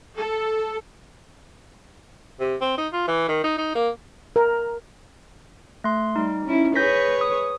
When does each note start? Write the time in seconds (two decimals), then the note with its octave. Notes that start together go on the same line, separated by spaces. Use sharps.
0.16 A4
2.40 C3
2.61 C4
2.78 D#4
2.93 F4
3.08 E3
3.29 D#3
3.44 D#4
3.58 D#4
3.75 A#3
4.36 A#4
5.84 A3 C6
6.16 G3 D#4
6.45 C#4 E4
6.76 G#4 B4 C#5 G6 A#6 B6
7.21 D#6